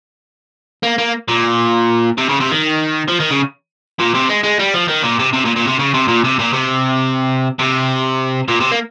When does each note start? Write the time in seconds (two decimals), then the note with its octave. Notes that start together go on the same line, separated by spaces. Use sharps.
0.83 A#3
0.98 A#3
1.28 A#2
2.18 C3
2.29 C#3
2.40 C3
2.52 D#3
3.08 F3
3.20 D#3
3.30 C#3
3.99 A#2
4.14 C3
4.29 G#3
4.43 G#3
4.59 G3
4.74 F3
4.88 D#3
5.03 A#2
5.19 C3
5.33 C3
5.45 A#2
5.56 A#2
5.67 C3
5.79 C#3
5.94 C3
6.08 A#2
6.24 C3
6.39 A#2
6.53 C3
7.59 C3
8.48 A#2
8.60 C3
8.71 A#3